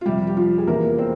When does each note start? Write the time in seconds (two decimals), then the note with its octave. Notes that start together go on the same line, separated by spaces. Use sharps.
0.01 F4
0.06 F2 C3 G3 G4
0.27 G4
0.37 F3 F4
0.58 G#4
0.67 E2 C3 F3 A#3 A#4
0.98 C4 C5